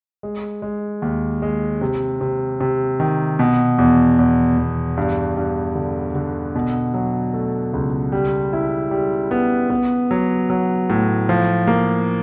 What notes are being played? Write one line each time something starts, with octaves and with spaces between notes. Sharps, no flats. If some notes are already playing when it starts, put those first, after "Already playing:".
G#3
G#3
D#2
G#3
C3
C3
C3
D#3
B2
E2
E2
E2
G2
G2
D3
D3
B2
F#3
A3
C#2
G3
E4
G3
B3
B3
F#3
F#3
A2
F3
A#3